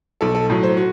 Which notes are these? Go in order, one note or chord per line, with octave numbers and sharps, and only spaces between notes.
B1 A4
A4
A2 F#3
C5
F#4